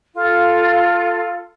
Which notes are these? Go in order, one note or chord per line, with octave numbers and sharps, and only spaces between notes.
F4 A4